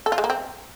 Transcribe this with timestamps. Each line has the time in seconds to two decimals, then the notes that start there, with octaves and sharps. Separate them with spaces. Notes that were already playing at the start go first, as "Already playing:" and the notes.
0.06 A4
0.12 F4
0.18 G#3
0.24 A#3
0.30 C4